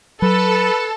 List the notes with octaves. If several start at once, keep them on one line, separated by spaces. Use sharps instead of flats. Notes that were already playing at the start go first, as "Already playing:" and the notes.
F#3 A4 B4